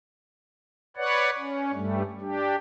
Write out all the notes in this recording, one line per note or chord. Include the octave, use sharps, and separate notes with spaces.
B4 C#5 D5 F#5
C#4
G2 G3 A3
D4 G4